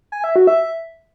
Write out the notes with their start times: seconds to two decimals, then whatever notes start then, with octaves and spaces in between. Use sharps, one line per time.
0.12 G#5
0.24 E5
0.36 F#4
0.47 E5